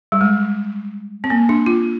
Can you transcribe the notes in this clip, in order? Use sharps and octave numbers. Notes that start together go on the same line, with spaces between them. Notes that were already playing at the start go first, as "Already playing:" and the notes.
G3
G#3
C4
A#3
D4
F4